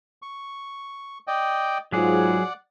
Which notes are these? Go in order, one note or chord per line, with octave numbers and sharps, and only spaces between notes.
C#6
D5 D#5 G5
G#2 F#3 F4 G#4 D5 F#5